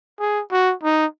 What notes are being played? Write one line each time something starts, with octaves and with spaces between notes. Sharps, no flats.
G#4
F#4
D#4